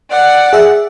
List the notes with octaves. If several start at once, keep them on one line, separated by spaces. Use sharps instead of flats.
D5 F#5
G#4 E5